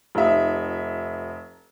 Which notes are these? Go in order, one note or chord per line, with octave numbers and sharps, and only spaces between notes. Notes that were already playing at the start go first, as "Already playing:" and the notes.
F1 D#4 E5